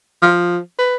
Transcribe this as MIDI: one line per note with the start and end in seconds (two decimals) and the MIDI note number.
0.22 0.58 53
0.79 0.96 71